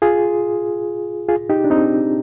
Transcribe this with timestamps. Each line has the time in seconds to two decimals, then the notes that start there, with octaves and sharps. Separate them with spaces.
0.02 F4 G#4
1.28 F4 G#4
1.50 D#4 G4
1.64 D4
1.70 C4 D#4